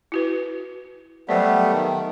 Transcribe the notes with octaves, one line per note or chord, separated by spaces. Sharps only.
E4 F#4 B4
F#3 G3 A3 B3 C5 D5
D#3